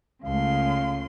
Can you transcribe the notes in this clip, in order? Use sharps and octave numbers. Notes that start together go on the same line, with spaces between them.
C#2 C#3 A3 F5 C6